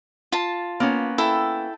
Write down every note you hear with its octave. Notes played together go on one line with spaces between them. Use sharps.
F4 A5
A#3 B3 C#4
E4 A4 G5